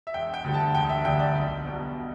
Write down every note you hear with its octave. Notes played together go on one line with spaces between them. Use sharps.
E5
E1 G5
G5
D2 D3 G3
A5
E1 G5
E5
D2 D3 G3 G5
D5
B1
B2 G3